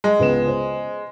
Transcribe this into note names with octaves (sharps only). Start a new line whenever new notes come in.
G#3
C#2 B3 E7
C5